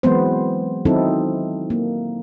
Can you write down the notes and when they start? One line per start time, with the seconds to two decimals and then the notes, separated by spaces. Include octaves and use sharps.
0.03 E3 F#3 G#3 B3 C4 C5
0.85 D#3 F#3 C4 D#4 E4 A4
1.70 A#3